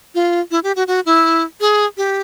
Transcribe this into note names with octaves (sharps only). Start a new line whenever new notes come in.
F4
E4
G4
F#4
F#4
E4
G#4
G4